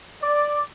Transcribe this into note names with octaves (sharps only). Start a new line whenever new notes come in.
D5